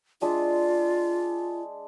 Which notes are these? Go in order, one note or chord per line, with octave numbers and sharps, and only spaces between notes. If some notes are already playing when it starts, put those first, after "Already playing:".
G#3 D4 F4 E5